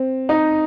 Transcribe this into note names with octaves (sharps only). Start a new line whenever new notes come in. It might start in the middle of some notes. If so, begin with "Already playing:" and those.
Already playing: C4
D#4